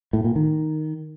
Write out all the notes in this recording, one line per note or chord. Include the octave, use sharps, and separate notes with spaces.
A2
A#2
D#3